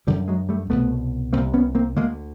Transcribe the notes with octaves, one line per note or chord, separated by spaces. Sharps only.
F#2 D3 F3 G3
F#3 G#3
G3 A3
C2 B2 A3 B3
C2 C3 A#3 C4
B3 C#4
A#3 C4
D2 D3 G#3 A#3